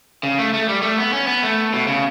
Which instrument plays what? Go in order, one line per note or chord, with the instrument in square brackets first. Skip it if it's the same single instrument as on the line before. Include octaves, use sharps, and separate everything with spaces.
[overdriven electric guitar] C#3
A3
A3
G3
A3
B3
C#4
B3
A3
B2
C#3